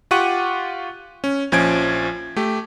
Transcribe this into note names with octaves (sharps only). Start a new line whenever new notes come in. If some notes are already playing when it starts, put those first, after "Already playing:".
F4 G4 F#5 C#6 F#6 D#7
C#4
A#1 F3 C#4 G#5 G#6 D7
A3 G4